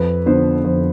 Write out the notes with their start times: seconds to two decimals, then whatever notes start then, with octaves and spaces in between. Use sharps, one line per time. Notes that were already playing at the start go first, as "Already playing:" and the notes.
Already playing: F2 B4
0.26 D3 F3 B3 C5
0.65 F2 C5